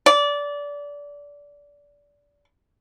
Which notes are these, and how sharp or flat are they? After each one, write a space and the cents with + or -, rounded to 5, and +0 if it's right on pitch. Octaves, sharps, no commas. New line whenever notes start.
D5 -20